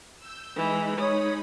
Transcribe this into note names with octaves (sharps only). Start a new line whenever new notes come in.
E6 G6
E3 G#3 D#4 B5
C#5 D#6